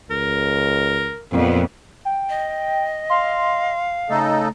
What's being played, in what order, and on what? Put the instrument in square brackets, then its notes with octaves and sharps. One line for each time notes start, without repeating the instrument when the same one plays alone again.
[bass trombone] C#2 [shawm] A#4
[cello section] F2 B3 [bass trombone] A#2
[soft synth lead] G5
[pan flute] D#5
[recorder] F5 [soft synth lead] C6
[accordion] C#3 D#4 A4 [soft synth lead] A3